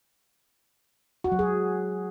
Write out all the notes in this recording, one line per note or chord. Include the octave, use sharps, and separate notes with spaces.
F#4
F#3
G#4